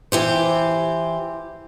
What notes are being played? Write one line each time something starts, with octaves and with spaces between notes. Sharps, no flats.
E3 G4 C5